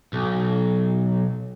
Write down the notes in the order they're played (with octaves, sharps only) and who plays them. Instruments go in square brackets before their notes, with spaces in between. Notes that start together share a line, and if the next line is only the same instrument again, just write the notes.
[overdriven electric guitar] B1